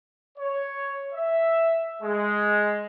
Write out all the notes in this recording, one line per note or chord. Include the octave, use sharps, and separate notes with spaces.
C#5
E5
G#3